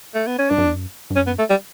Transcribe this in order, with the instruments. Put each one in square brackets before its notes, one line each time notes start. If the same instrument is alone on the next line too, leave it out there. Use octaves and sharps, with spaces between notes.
[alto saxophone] A3
B3
C#4
[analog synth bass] G2 [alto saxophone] D4
[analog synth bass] F#2
E2
F#2
G2
[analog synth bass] F#2 [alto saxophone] C#4
[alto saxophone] B3
A3
G3